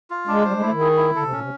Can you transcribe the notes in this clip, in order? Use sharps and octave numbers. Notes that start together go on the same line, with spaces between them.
F4
G#3 D4
G3 C5
G#3
A3 E4
D#3
G#4
E4
D3 A4
C3
A#2 C#4
C3